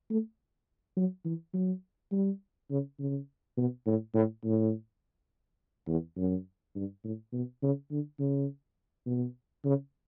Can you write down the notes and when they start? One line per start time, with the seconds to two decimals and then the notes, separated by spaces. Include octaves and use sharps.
0.10 A3
0.97 F#3
1.25 E3
1.54 F#3
2.12 G3
2.71 C#3
3.00 C#3
3.57 B2
3.86 A2
4.14 A2
4.44 A2
5.88 E2
6.17 F#2
6.76 G2
7.04 A2
7.33 B2
7.62 C#3
7.91 D3
8.20 C#3
9.06 B2
9.65 C#3